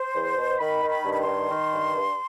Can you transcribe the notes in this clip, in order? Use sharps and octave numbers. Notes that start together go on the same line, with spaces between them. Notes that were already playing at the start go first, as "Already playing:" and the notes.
Already playing: C5
E2
B2
D#3 B5
D#3
B5
G2
B5
C6
D#3
D#3
G2
G2